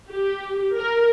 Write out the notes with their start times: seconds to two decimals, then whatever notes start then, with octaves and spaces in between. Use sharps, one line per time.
0.10 G4
0.77 A#4